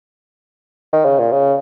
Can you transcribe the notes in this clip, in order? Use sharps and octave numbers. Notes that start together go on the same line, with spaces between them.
D#3
C#3
A#2
C#3